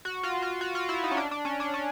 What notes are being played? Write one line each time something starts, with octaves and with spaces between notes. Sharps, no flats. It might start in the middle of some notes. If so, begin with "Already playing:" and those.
F#4
F4
F4
F#4
F4
E4
D#4
C#4
D4
D4
C#4
D4
C#4